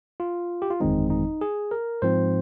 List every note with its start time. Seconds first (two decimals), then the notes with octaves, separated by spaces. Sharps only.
0.20 F4
0.62 G4
0.70 F4
0.80 G1 F2 D#3 G#3 C4 D#4
1.10 D#4
1.41 G#4
1.71 A#4
2.02 G#2 F3 C4 C5